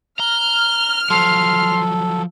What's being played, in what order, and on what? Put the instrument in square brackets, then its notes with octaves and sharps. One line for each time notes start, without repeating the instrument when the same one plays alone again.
[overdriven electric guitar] A#5 [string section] F6 [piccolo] G7
[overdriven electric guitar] F3 F#3 [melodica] A4 [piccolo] C6